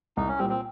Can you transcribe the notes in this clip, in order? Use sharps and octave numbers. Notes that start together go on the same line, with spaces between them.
C2 D#4
C#4
A#2 G3 C4
C4